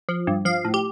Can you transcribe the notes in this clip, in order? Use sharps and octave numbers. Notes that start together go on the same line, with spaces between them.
F3
G2
F3 F5
A2
G4